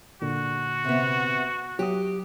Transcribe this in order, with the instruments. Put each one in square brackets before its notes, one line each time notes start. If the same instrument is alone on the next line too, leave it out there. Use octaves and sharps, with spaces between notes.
[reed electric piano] A#2 D3 [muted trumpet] F#4
[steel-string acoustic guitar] C3 B3
[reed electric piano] F#3 D#6 [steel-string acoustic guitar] G4